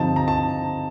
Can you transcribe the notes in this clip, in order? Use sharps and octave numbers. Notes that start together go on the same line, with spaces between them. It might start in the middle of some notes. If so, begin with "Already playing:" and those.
Already playing: G2 D3 F3 C4 D#4 A5
A#5
A5